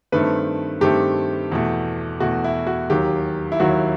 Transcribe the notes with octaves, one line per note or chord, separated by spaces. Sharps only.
G2 D#3 A3 C4 B4
G2 D#3 A3 C4 G4
E2 B2 A3
E2 B2 A3 F#4
E4
F#4
D#2 D#3 F#3 G4
E4
D#2 D#3 F#3 F#4